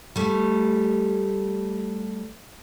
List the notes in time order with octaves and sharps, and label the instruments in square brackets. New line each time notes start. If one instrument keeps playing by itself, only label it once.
[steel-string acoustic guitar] G3 A3